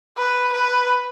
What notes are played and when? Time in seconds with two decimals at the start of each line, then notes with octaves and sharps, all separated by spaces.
0.18 B4
0.53 B4